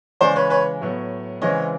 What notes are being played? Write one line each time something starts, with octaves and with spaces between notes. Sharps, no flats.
C#3 E3 G#3 C5 D5
B4 C#5
B4 C#5
A2 F#3 B3
C#3 E3 G#3 C4 C#5 D#5